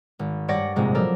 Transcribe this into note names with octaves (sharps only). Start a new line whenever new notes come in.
G#1
G2 C#5 D5 F#5 A#6
A#1 G#2 C3 G#3 A#6
F3 F#3 A4 A#4 D5